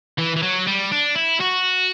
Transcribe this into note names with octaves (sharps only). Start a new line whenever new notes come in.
E3
E3
F#3
G3
D4
E4
F#4